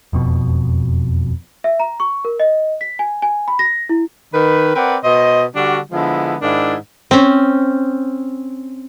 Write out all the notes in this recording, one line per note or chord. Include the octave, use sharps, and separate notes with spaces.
E1 F2 B2
E5
A#5
C#6
A#4
D#5
B6
G#5
G#5
B5
A#6
E4
D#3 B4
C4 A#4 B4 D5 F#5
B2 C5 D#5
D3 G3 D4 F#4
D3 F3 G#3 B3 E4
G#2 D#3 D4 E4
C4 C#4